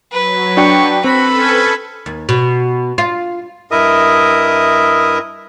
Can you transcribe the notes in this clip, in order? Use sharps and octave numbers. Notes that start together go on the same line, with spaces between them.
F#3 B4
D4 F#4 G5 C#6
C4 F#4 A4 B4 B5
C#4
D#2
B2
F4
G2 E4 A#4 D#5 E5 D#6